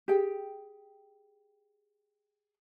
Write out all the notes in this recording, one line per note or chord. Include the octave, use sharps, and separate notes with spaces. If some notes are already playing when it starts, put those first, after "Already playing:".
G4 G#4 G5